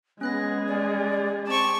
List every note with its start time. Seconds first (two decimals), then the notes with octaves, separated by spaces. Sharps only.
0.21 G#3 B3 C#4 G#4 F#6 A#6
0.67 D5
1.47 C4 A5 C#6 D6 D7